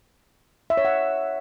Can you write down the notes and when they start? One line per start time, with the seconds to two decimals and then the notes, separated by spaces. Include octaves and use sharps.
0.70 E5
0.77 C#5
0.85 F#5